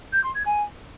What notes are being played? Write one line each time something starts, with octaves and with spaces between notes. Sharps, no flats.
G6
C6
G#6
G#5